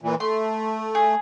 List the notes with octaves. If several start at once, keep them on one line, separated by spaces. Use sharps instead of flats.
A#2 E3
A3 C6
G#4